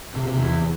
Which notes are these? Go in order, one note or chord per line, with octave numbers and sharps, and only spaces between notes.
C3
C3
E2